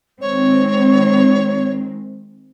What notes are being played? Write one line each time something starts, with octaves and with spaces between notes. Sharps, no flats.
D#3 G#3 C4 C#5